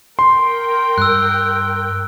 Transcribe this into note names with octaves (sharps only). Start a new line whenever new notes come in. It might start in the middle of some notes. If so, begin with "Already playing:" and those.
A#4 G5 C6
G2 E6 F#6